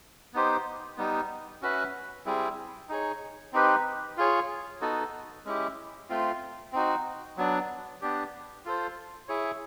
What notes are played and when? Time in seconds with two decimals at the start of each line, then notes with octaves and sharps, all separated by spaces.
0.34 B3 D#4 G4 C5
0.98 G3 B3 D#4
1.62 C#4 F#4 B4 E5
2.26 G3 C4 E4 G#4
2.89 D#4 G#4 C#5
3.53 C4 D#4 G4 B4
4.17 F4 G#4 C#5
4.81 B3 D#4 F#4 A4
5.45 G#3 C#4 E4 G4
6.10 A3 C4 F4
6.73 C4 D#4 F#4
7.37 F#3 B3 D4
8.01 B3 D4 G4
8.65 F4 A4 C5
9.28 E4 G#4 C#5